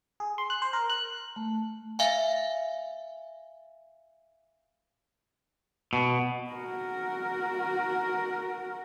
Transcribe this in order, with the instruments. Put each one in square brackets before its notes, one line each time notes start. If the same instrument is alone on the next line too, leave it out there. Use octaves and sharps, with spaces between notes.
[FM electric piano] G#4
C6
F#6
C5
A#4
F#6
[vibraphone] A3
[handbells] E5 F5 G#5
[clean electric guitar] B2
[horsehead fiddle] F#4 A#4